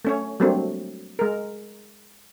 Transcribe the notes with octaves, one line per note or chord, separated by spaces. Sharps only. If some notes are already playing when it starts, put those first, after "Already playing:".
A3 C#4 C#5
F#3 G3 A3 A#3 C4 D4
G#3 A#4